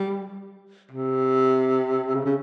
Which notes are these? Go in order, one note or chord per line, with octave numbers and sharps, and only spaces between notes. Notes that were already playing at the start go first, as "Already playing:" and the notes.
Already playing: G3
C3
C#3
C#3